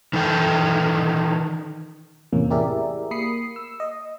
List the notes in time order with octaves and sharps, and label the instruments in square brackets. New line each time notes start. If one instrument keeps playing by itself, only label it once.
[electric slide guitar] D#3 E3 A4 G5
[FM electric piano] E2 A2 C3 A#3 C#4
E4 G4 G#4 A#4 D5 E5
A#3 B5 D#6 C7 C#7
E6
D#5